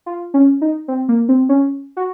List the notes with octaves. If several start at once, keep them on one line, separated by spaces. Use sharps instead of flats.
F4
C#4
D#4
C4
A#3
C4
C#4
F#4